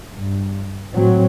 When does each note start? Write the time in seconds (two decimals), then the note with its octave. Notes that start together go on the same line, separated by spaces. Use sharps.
0.14 G2
0.94 A2 F#3 C4